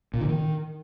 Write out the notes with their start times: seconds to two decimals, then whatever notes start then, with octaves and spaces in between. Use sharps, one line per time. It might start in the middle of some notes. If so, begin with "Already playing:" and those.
0.14 A#2
0.21 D3
0.28 D#3